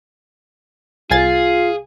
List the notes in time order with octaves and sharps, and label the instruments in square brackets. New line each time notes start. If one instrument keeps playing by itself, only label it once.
[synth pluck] C2 G#5 A6 [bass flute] F4 [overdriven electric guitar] G#4 [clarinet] F5